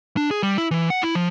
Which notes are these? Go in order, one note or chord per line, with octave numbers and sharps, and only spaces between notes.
D4
G#4
G3
E4
E3
F#5
E4
F3